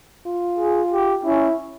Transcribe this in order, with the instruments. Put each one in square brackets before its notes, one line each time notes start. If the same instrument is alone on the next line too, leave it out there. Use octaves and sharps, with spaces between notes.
[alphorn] F4
[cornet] G#4
G4
[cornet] C#4 [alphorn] E4